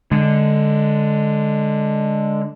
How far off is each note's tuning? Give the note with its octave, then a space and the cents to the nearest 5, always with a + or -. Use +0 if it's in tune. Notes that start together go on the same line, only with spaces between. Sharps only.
D3 +0 G#3 +0